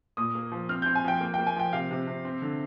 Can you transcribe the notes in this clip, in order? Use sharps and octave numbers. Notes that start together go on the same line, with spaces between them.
A#2 D#6
A#3
F3
C4 F6
C4 G6
G#5
F3 G5
A#3
A#3 G5
G#5
F3 G5
C3 F5
C3
C3
C4
D3